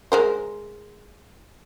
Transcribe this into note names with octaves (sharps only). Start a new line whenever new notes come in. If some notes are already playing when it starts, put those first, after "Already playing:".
G#3 A#4 C5